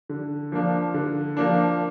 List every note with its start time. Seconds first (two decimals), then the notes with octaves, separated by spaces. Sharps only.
0.09 D3
0.52 F3 A#3 D4
0.94 D3
1.37 F3 A#3 D4